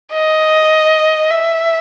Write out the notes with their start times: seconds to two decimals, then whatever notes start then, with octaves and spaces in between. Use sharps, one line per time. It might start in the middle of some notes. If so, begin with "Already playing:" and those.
0.13 D#5
1.30 E5